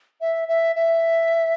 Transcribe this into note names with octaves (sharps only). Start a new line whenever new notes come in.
E5
E5
E5